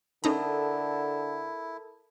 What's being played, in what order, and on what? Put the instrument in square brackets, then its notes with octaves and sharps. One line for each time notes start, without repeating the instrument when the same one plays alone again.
[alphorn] D3 [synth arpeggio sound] C#4 D#4 A#5 [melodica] E4 [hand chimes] A4 A#4 A5